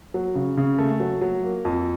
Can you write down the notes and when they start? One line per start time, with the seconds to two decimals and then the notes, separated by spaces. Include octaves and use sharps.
0.14 F#3
0.35 C#3
0.57 C#3
0.78 A3
1.00 F#3
1.21 F#3
1.43 A#3
1.65 F2